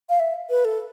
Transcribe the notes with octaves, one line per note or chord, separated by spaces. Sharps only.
F5
E5
B4
A4